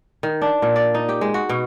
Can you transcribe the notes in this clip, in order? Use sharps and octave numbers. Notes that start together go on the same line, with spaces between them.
D#3
D4
A#2
D5
D#4
G4
G#3
F#4
B2